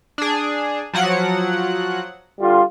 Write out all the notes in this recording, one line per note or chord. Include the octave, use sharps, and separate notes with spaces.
D4 G#4
F3 F#3 F#5
D3 G3 F4